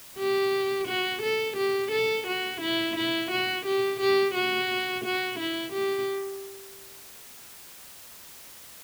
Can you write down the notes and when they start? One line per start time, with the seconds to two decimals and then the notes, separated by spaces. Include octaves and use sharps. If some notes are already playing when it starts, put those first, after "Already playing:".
0.18 G4
0.88 F#4
1.23 A4
1.57 G4
1.92 A4
2.27 F#4
2.61 E4
2.96 E4
3.31 F#4
3.66 G4
4.01 G4
4.35 F#4
5.05 F#4
5.39 E4
5.73 G4